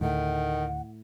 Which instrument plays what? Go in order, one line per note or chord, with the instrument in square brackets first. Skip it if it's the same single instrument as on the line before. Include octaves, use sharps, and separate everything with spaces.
[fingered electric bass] D2 [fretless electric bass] A2 A3 [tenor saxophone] D#3 [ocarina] F#5